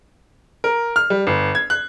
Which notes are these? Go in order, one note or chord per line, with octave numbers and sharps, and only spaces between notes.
A#4
F6
G3
G1
G#6
F#6